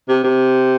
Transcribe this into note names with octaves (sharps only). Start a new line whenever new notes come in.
C3
C3